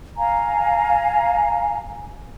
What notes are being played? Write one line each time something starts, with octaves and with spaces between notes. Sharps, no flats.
F5 G#5 A#5